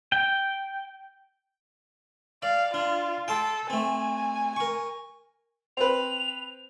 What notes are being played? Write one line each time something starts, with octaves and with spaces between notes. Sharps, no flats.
G5
D5 F5
D4 F4
A4 G5 A5 C6
A3 C4 G#5
A#4 C#6
C4 B4 F7